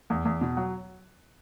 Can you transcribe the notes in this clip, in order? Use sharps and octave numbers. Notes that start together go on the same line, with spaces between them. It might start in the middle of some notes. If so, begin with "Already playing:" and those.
E2
E2
B2
F#3